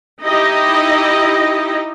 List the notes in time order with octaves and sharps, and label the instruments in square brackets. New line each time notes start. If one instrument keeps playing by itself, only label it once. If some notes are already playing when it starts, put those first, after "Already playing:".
[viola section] D#4 E4 G4 D#5